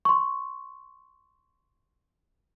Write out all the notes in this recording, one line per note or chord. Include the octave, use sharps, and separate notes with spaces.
C6 C#6